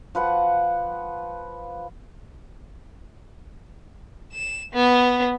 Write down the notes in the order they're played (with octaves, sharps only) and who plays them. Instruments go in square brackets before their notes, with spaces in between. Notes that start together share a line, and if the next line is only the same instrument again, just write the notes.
[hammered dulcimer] F3 B4 F#5
[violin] E7
B3